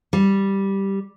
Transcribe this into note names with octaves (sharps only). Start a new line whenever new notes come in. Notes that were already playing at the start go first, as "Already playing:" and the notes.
G3